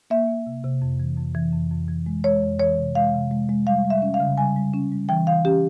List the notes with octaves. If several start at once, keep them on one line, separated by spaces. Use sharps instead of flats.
A#3 E5
A#3
C3
C3
F2
E3
F2
E3
F2
F2
E3
G#3
G#3 C#5
F2
E3 C#5
C3
G#3 F5
C3
G#3
G#3
G3 F5
G3
E5
C#4
F5
C#3
G3 G#5
G3
C#4
G3
E3 G5
E3 F5
C#4 G4